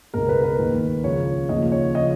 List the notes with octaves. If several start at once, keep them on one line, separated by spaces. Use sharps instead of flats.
C#2 B2 A#4
B4
B4
D#2 D#3
C#2 C#3 F3 C#5
D#2 C#3 F3 D#5
C#5
C#3 F3 D#5